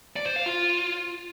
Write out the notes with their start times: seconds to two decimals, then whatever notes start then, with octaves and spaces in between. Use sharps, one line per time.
0.16 D5
0.26 C5
0.36 F5
0.46 F4